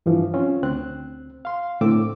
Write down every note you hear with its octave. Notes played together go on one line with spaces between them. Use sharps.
G2 E3 F3
C4 C#4 F4
D2 C4 F#6
F5 C6
A2 D3 A3 C4 D6 E6